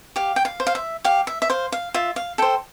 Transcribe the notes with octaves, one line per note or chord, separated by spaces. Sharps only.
G4 F5
G5
F5
C5
F5
E5
G4 F5
E5
E5
C5 F5
F5
F4 E5
F5
A4 C5 G5